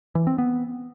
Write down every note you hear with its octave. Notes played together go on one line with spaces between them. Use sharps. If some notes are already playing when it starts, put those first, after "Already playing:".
E3
C4
B3